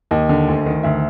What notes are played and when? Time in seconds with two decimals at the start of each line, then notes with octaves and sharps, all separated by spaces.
0.11 D#2 D#5
0.29 D3
0.48 D2
0.66 D#3
0.83 D2 E5